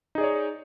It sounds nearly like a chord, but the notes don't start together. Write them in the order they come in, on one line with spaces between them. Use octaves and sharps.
D#4 G#4 D5 C#5